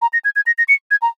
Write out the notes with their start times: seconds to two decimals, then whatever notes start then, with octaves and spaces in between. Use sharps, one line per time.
0.02 A#5
0.13 A#6
0.25 G#6
0.36 G#6
0.46 A#6
0.58 A#6
0.68 C#7
0.91 G#6
1.02 A#5